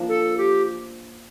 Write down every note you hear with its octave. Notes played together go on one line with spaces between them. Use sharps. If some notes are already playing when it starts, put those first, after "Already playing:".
Already playing: F3 A#3 D4
A4
G4